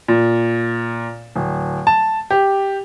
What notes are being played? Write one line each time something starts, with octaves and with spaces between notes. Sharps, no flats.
A#2
D1
A5
G4